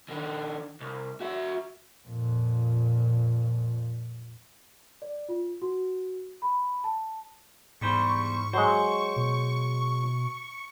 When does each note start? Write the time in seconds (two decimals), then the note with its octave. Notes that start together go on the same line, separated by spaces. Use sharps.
0.08 D#3 D4
0.80 C2
1.20 F#4 E5
2.07 F2 A#2
5.02 D5
5.29 F4
5.62 F#4
6.42 B5
6.84 A5
7.81 E2 G#2 G3 C5 C#6
8.53 F#3 G#3 C5
9.16 B2